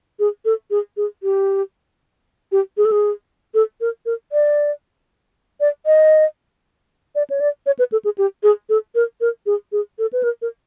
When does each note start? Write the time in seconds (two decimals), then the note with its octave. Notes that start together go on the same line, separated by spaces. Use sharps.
0.20 G#4
0.45 A4
0.71 G#4
0.97 G#4
1.23 G4
2.52 G4
2.77 G#4
2.85 A4
2.92 G#4
3.54 A4
3.81 A#4
4.06 A#4
4.32 D5
5.60 D5
5.86 D#5
7.15 D5
7.30 C#5
7.40 D5
7.66 C#5
7.79 B4
7.92 A4
8.05 G#4
8.18 G4
8.43 G#4
8.69 A4
8.95 A#4
9.21 A#4
9.46 G#4
9.72 G#4
9.99 A4
10.13 B4
10.23 A#4
10.42 A#4